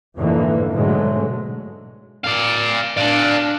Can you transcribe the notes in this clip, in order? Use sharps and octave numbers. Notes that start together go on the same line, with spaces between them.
F2 G#2 B2 D3 E3 A#3
G#2 B2 D3 F#3 G#3 A3
D5 F5
D4 D5 F5